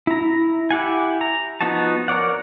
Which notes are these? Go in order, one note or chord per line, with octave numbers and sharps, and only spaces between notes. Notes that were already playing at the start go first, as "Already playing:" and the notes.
E4 A#5
E4 G4 F#5 G#5
A#5
F3 B3 D#4 F#4 A5
A#4 C#5 D5 F#5